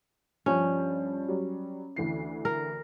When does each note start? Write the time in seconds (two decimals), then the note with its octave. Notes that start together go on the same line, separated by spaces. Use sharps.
0.46 G2 F3 C#4
1.28 F#3 G3
1.96 D2 E3 C7
2.45 A#4